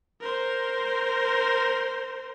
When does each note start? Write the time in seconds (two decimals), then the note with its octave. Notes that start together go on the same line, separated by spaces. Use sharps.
0.21 A#4 C5